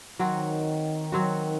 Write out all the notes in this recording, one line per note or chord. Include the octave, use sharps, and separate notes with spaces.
D#3 F#3 C4 F#4
F#3 C4 F#4